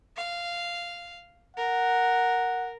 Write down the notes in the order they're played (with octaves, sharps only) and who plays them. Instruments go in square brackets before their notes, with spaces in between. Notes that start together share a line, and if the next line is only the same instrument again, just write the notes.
[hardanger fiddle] F5
[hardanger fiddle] A#4 [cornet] F#5